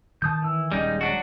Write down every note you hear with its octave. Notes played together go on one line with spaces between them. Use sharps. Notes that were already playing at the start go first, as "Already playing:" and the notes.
D#3 A5 D#6 G6
E3 E6
D#1 G3 G#3 C#4 D#4 D#5
F#3 D4 F#4